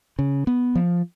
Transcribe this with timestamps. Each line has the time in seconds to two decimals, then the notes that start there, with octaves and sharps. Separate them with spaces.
0.19 C#3
0.47 B3
0.75 F3